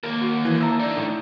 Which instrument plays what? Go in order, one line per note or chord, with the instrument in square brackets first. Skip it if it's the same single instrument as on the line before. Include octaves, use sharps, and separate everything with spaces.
[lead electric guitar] D#2 A#3 [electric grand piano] A#4
[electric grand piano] F#4
E3
[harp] E5 A5 A#5 [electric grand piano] E6
[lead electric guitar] D3 D#4 [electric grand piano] D5
[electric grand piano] A2